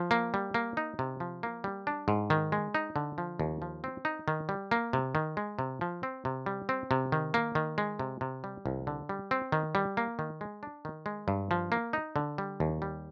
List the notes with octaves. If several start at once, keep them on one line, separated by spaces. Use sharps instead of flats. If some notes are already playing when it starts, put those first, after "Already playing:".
Already playing: F3
A#3
G3
A#3
D#4
C3
F3
A#3
G3
D4
G#2
D#3
G#3
D#4
D3
F3
D#2
F3
C4
D#4
D#3
G3
A#3
C3
D#3
G#3
C3
F3
C4
C3
G3
C4
C3
D#3
A#3
D#3
G#3
C3
C3
G3
C2
D3
G3
C4
D#3
G3
A#3
D#3
G#3
D4
D#3
G#3
G2
F3
A#3
D#4
D3
G3
D#2
G3